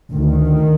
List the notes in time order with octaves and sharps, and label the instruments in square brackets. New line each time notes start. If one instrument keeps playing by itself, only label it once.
[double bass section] D2 D#3